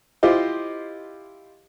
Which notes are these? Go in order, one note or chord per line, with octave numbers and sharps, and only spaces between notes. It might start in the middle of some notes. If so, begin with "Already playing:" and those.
E4 F4 G4 C5 D#5